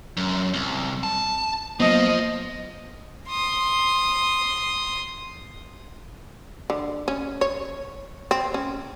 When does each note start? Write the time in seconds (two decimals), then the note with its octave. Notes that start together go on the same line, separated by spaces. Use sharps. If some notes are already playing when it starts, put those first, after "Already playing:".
0.17 F#2
0.54 C2
1.03 A5
1.80 F#3 A#3 B3 F4 C5 D#5
3.28 C6 D#6
6.70 D3
7.08 C#4
7.41 C#5
8.31 C4
8.54 C#4